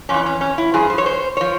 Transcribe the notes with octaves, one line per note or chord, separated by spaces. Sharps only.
F2 E3 C#4
C#4
C#4
E4
G2 F3 G#4
C5
C#5
C5
F3 C#5